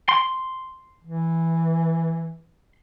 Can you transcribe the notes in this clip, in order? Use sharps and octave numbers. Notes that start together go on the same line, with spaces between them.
C6
E3